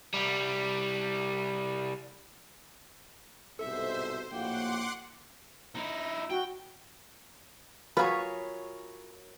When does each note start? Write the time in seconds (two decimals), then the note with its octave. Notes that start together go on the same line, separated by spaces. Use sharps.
0.14 C2 G3
3.59 C2 G#2 B2 A4 C5 E5
4.32 A#1 A2 A#3 F#4 F#5 G5 C6 D6
5.75 D#4 E4
6.30 F#4 G5
7.97 F#3 F4 F#4 G#4 A#4 B4 C#5 B5